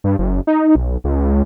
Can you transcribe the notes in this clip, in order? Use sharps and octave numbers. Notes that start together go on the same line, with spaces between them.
G2
F#1
D#4
B1
C#2